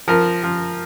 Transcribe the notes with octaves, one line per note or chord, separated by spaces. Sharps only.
F3 A#4
F3